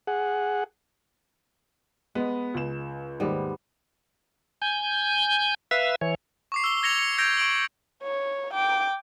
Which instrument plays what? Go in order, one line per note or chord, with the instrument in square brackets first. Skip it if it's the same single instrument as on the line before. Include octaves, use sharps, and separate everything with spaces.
[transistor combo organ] G#4 F#5
[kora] G#3 [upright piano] B3
[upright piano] C#2 E7
[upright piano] D#2 [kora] G#2 G3 B3
[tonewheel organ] G#5 G6
B4 E5 F5 E6
E3 C#5
[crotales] C#6 D6 C7
E6 G7
G#6 A#6 C#7 F7
C#7
E6 G6 G#6 A#6 D7 F7
C#6 D7 F#7
[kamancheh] C#5
G5 D6